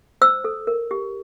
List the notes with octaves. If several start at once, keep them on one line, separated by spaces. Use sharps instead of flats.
C5 E6
A4
A#4
G4